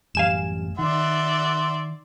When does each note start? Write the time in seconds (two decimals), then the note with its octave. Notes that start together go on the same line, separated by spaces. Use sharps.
0.15 A1 F#2 G3 F5 G#5 E7
0.79 D#3 D5 E5 F#5 C6